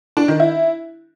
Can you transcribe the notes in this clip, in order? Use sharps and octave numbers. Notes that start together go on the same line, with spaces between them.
D4
D#3
E4